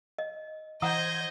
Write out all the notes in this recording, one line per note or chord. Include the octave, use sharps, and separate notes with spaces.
D#5
E3 C5 D#5 F#5 A#5 D#6 G6 G#6